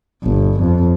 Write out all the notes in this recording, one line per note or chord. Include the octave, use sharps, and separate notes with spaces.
G1
F2